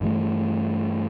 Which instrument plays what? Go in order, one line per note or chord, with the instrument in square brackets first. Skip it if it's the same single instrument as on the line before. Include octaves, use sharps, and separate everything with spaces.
[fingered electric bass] G2 E3 A3